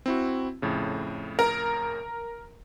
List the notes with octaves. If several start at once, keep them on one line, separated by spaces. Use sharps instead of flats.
C4 E4 F#4
F2 A2 C#3
A#4